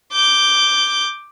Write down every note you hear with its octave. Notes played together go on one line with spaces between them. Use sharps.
D6 G6